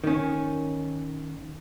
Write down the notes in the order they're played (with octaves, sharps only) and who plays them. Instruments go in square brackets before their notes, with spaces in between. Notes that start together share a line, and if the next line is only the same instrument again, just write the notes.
[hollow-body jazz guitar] D#3 C#4